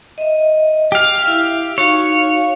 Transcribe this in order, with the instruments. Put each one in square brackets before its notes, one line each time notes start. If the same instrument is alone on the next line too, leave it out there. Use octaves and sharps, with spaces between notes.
[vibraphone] D#5 E5
[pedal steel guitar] G4 F5
[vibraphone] E4 E5
[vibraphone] D#4 F#4 F5 [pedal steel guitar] C#5